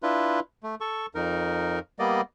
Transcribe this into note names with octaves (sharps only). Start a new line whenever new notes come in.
D4 E4 F4 B4
A3
A4 C#6
F2 D#4 A#4
G3 A#3 B3 D5 D#5